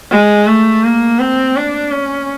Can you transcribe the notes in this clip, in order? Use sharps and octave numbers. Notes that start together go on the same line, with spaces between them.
G#3
A3
A#3
C4
D4
C#4